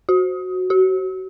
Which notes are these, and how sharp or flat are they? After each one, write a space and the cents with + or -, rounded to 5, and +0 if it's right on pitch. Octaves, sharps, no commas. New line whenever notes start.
F#4 -5
F#4 +30